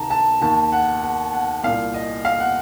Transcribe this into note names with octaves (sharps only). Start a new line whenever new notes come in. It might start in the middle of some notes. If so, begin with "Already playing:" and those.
Already playing: C#2 C3 D#3 A5 A#5
A5
D#2 D#3 A5
F#5
F#5
F#5
C2 A#2 F5
D#5
F5
F#5